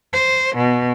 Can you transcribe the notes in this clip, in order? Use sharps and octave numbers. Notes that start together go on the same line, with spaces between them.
C5
B2